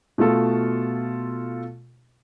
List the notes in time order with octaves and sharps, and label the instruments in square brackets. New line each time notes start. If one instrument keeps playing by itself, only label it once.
[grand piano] B2 A3 F4 A4